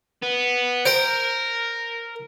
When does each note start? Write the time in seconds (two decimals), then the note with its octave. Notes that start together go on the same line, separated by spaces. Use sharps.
0.22 B3
0.85 A#4 C5 G5 C6